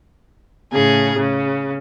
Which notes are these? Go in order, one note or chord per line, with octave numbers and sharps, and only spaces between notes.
A2 C#3 G#4
C#3